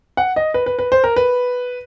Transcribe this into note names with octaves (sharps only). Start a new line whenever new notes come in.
F#5
D#5
B4
B4
B4
C5
A#4
B4